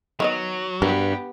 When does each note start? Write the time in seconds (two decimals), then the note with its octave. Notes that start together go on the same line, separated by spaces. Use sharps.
0.20 D#3 F#3 B3 D#5
0.82 G2 B3 F#4 G4 A#4